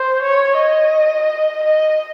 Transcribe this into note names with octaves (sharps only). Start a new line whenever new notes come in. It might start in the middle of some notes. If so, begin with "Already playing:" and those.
Already playing: C5
C#5
D#5
D#5